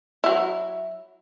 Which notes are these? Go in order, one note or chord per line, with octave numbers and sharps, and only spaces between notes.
F#3 E4